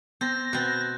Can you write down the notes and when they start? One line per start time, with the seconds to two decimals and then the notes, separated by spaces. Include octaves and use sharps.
0.21 B3 C4 G6 A6 A#6
0.53 B2 C4 F#6 A6